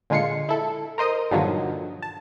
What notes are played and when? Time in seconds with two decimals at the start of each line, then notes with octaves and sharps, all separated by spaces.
0.10 A#2 D3 G#3 F4 C7 C#7
0.49 E4 A4
0.98 A#4 C5 D#5 D#6
1.31 G2 A#2 D3 D#3 F3 F#3
2.02 A5